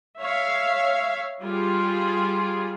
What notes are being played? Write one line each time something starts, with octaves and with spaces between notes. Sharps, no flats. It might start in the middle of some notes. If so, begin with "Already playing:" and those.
C#5 E5 F5
G3 F4 G#4